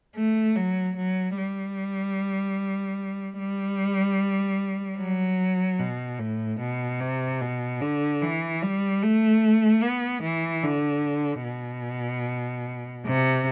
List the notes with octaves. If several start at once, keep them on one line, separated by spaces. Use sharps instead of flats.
A3
F#3
F#3
G3
G3
F#3
B2
A2
B2
C3
B2
D3
E3
G3
A3
B3
E3
D3
B2
C3